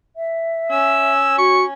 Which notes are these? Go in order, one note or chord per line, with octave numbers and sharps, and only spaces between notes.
E5
C#4 E6
F#4 C#6